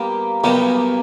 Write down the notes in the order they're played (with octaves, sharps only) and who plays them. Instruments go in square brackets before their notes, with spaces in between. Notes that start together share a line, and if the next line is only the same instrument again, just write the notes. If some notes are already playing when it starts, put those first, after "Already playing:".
Already playing: [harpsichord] G3 B3 G4 [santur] A#3
[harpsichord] B1 B2 G3 B3 [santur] A#3